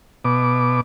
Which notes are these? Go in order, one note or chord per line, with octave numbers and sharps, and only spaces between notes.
B2 D6